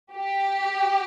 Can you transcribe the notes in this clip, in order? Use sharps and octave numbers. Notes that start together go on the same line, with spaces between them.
G4